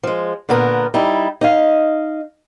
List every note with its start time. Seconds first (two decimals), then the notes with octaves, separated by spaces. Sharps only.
0.03 F3 G#3
0.49 A#2 D3 B3 A#4
0.94 G3 D#4 E4
1.41 D#4 D#5 F5